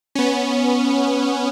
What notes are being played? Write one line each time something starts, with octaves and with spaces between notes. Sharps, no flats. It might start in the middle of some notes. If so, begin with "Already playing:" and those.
B3 C#4